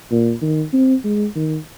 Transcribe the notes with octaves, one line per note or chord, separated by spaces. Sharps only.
A#2
D#3
C4
G#3
D#3